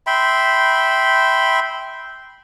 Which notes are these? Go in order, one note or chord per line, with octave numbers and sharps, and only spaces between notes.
E5 G5 B5 C6